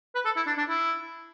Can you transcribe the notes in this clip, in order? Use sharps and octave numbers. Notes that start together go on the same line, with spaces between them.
B4
A4
E4
D4
D4
E4